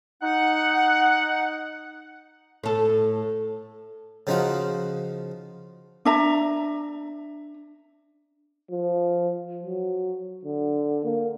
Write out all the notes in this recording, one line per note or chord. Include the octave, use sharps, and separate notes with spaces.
D#4 F#5
A2 A4
C#3 F3 D#4 F4 F#4
D4 E5 A#5
F3
F#3
D3
A#3